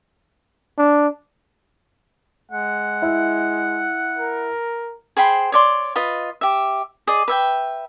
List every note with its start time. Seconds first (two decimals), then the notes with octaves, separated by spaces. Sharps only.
0.78 D4
2.51 G#3 F#5
3.02 E4
4.19 A#4
5.17 G#4 C5 G5 B5
5.52 C#5 D5 C6
5.96 F4 B4 D#5
6.41 G4 E5
7.07 G#4 D5 D#5
7.28 B4 E5 G5